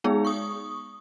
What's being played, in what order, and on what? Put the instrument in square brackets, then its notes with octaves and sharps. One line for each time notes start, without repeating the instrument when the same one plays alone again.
[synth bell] G#3 B3 D#4 G#4
C#6 D#6